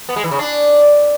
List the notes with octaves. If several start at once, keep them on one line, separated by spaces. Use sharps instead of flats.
B3
G#3
E3
C#3
D4